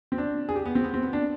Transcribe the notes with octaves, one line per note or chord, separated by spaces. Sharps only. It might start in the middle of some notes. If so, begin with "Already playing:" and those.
C4
D4
G#4
G4
B3
C4
B3
C4
B3
D4